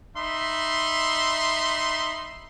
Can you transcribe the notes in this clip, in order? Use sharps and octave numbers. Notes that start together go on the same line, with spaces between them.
D#4 E5 B5 C6